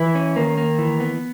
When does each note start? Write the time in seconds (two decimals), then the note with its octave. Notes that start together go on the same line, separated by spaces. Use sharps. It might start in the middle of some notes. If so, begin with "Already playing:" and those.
Already playing: E3 E4
0.15 C#4
0.36 D#3 A#3
0.58 A#3
0.79 E3
1.00 B3